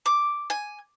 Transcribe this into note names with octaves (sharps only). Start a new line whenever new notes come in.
D6
G#5